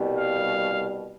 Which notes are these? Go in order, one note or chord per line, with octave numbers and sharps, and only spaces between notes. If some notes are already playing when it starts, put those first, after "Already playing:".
Already playing: C2 B2 G3
F5